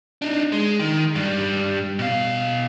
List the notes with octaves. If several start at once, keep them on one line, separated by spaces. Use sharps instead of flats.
D4 D#4
G#3
D#3
G2 G3
B2 F5